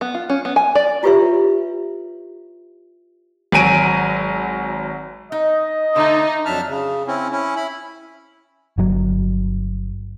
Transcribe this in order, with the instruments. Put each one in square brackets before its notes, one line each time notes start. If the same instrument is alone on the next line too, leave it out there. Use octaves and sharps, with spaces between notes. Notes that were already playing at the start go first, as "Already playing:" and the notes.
[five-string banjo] B3
F4
C#4
B3
G#5
D5
[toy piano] E4 F4 G4 B4 C#5 E5
[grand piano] G#1 F#3 G#5 D7 D#7
[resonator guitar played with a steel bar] D#4 [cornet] D#5
[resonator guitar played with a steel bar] D3 A3 [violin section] D#4
[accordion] F2 F#3 D4 E5 A5 F6
C#3
C4 C#4 E4
C#4 E4
E4 B5
[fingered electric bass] G1 F#3